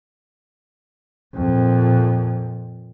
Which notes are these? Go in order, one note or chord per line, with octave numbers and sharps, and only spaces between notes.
F2 A#2